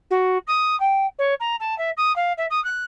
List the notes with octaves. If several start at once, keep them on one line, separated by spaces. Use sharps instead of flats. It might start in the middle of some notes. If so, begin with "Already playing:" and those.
F#4
D#6
G5
C#5
A#5
A5
E5
D#6
F5
E5
D#6
F#6